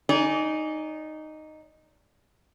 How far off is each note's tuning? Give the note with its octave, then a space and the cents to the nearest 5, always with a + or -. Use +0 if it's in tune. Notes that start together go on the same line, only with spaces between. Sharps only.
D#4 -5 D5 -35 G#5 +0